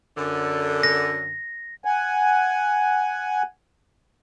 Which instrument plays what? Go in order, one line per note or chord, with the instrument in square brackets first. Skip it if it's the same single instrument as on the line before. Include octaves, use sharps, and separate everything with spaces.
[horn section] F#2 D3
[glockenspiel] A#6
[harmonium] F#5 G#5